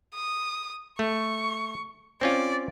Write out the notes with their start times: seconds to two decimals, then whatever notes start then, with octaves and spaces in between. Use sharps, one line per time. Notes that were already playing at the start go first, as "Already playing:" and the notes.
0.14 D#6
0.99 A3 C#6
2.21 C4 C#4 F4 D5